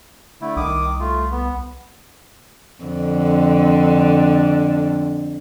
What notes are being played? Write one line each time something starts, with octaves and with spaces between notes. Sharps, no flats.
D3 A3 E4
C2 D#3 D6 D#6
A3 F4
B3
F2 D3